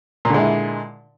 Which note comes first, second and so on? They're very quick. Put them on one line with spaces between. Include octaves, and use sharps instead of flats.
A#2 D3 G#3 E4